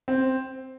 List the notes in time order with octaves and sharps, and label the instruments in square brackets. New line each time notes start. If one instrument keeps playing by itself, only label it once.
[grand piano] C4